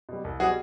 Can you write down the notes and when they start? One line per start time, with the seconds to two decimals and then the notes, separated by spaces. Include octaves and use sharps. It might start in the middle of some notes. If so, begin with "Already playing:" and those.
0.09 B2 G3
0.24 C2
0.40 B2 G3 F#4 G#4